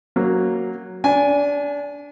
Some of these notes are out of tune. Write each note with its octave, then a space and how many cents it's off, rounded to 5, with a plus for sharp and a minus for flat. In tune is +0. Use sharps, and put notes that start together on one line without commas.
F#3 +0 A#3 +0
D4 -25 G#5 +0